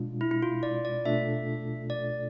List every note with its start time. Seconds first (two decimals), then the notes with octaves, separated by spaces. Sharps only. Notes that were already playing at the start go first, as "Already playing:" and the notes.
Already playing: B2 G#3 D4 F4
0.21 E4
0.31 E4
0.42 F4
0.63 D5
0.85 D5
1.05 B2 A3 D4 F4 A4 E5
1.90 D5